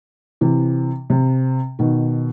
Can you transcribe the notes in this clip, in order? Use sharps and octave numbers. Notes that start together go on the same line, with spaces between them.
C3 E3
C3
B2 D#3